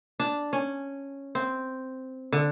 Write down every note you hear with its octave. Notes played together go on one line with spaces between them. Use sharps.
D4
C#4
C4
D3